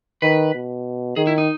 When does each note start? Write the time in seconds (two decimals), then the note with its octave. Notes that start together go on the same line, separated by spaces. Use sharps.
0.22 D#3 B4
0.54 B2
1.16 D#3 G#4
1.27 E4
1.38 D#4